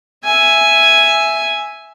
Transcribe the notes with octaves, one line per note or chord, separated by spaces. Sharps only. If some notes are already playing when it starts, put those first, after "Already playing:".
E5 G#5